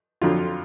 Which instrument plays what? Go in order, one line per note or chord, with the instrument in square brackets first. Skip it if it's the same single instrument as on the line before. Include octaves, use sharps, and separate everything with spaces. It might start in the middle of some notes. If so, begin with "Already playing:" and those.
[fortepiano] F2 D3 F#3 F4